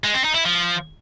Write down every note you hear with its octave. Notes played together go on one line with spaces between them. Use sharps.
G#3
C4
D#4
E4
F3